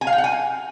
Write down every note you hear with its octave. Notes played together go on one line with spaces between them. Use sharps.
G#5
F5
G5
F#5
G#5